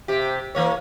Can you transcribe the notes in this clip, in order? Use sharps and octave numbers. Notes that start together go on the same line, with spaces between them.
C3 G4
E3 A#3 C#5